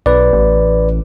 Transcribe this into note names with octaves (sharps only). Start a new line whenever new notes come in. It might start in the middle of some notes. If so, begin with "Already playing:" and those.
B1 B4 D5
A1